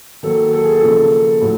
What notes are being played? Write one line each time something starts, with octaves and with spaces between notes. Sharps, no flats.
D#3 F#3 A#3 A4
A4
G#4
A4
C#3 F3 A#3
A2 F#3